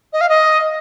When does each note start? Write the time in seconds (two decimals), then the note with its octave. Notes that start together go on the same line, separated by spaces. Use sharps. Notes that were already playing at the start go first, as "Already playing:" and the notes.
0.13 D#5
0.21 F5
0.29 D#5